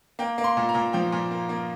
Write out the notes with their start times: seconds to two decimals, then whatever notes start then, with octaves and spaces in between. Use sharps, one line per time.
0.19 A#3 G5
0.38 A#3
0.44 C6
0.57 A#2
0.69 A#5
0.75 A#2
0.93 F3 G5
1.12 A#2
1.31 A#3
1.49 A#3